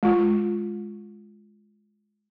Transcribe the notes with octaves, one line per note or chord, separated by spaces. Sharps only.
G#3 F4